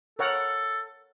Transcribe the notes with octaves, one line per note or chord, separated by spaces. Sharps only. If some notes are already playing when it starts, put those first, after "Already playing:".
A4 A#4 C#5 F#5